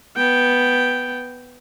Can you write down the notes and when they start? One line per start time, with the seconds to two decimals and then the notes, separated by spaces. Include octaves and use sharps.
0.16 B3 G5